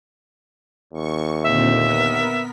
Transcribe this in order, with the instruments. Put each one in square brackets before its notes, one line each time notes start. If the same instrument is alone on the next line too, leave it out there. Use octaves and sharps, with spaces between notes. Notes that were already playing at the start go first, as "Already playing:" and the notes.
[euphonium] D#2 [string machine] C#6
[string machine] A#2 D3 C4 [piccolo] E5
[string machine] B3 A#4 B6